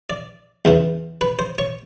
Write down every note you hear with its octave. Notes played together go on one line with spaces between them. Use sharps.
D5
E2 C#3 E3
B4
C5
C#5